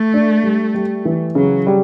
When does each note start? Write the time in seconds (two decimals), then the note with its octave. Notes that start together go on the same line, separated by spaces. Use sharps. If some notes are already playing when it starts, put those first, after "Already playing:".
Already playing: A3
0.14 D4
0.43 G3
0.74 G3
1.05 E3
1.35 C#3 F#3
1.67 G3